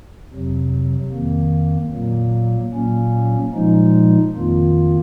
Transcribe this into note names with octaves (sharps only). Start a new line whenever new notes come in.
F2 C3 F#3
F2 D#3 A#3
A#2 F#3 A#3
A#2 F#3 A#3 C#4
A#2 F3 G#3 D#4
F2 D#3 A#3 F4